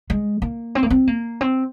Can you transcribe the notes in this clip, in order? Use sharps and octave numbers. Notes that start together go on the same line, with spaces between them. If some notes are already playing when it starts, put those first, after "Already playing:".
G#3
A#3
C4
A#3
C4
A#3
C4